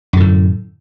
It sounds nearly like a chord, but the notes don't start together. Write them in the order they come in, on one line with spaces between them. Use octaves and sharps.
F#2 D3 A2